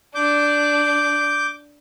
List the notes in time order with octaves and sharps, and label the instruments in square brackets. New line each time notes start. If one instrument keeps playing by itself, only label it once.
[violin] D4 [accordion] D6 G6